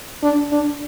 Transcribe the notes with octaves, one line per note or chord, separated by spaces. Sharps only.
D4
D4